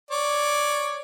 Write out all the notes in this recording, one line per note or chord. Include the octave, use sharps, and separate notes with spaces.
C#5 D5